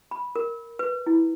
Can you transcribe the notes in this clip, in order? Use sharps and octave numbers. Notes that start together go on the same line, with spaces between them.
B5
A#4
B4
E4